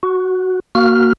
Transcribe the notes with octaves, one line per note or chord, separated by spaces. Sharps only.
F#4
A#3 F#4 F6